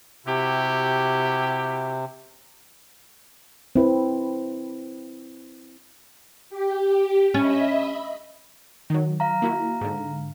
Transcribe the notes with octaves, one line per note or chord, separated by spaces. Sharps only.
C3 E4 F#4 G4
C4 E4 B4
G4
C#4 D#5 E5 B5
D#3 F#3
F5 A#5
A#3 E4 F#4
G#2 D3